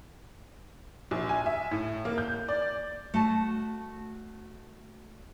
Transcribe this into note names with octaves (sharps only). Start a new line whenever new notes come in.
A#1
G#5
E5
A2
A#3
G6
D5
A3 F#4 A5